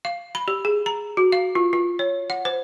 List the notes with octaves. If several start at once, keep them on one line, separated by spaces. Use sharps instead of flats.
F5
B5
G4
G#4
A#5
F#4
F5
F4
F4
C#5
F#5
C5